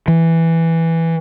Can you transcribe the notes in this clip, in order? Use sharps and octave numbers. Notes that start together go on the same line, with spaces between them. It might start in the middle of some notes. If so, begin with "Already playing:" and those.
E3